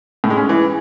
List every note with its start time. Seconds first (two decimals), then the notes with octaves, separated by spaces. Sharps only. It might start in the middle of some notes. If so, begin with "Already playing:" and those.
0.24 A2
0.30 G#3
0.37 C#4
0.43 G#3
0.49 E3